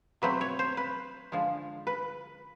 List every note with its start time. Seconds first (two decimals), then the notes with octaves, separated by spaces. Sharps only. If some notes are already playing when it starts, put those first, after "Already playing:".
0.22 B2 F#3 A3 C4 B4
0.41 C#5
0.59 C5
0.77 B4
1.32 D3 F3 G#3
1.87 B4